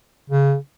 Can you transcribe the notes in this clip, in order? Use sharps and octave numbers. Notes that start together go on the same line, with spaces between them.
C#3